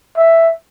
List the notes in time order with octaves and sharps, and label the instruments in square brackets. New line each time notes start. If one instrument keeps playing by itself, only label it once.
[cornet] E5